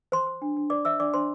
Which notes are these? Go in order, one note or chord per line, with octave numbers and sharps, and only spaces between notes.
C5 C6
C5
D4
D4
C5 D5 D6
C5 E5 E6
D4 D5 D6
D4 C5 C6